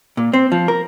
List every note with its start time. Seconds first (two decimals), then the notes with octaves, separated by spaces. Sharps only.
0.17 A#2
0.33 C4
0.52 F3
0.68 A#4